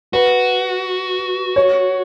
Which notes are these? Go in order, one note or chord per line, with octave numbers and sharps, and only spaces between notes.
F#4 B4
C#5